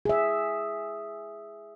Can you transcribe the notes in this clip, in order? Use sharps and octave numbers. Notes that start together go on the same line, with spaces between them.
G#4 E5